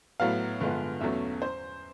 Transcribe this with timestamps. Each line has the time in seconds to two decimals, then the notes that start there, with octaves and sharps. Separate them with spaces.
0.20 A2 F#3 B3 F5
0.60 G2 D3 F3 G#3 B3
1.01 E2 B2 F#3 A3 C#4 E5
1.42 C5